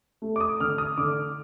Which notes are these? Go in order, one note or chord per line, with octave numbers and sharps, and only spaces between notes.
A3
D6
D#6
D3 F6
D#6
D3 D6